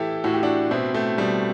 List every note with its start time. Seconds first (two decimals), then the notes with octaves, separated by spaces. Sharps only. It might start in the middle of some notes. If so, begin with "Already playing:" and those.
Already playing: A2 E3 E4 G4 A4
0.24 A2 F#4
0.34 G4
0.43 D4 F#4
0.71 B2 C4 E4
0.94 A3 C4
1.18 B2 G3